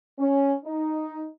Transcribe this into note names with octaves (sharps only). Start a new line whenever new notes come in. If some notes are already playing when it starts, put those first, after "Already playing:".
C#4
D#4